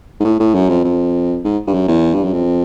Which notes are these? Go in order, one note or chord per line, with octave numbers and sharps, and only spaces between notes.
G#2
A2
A2
F#2
F2
F2
G#2
G2
F#2
E2
G2
F#2
F2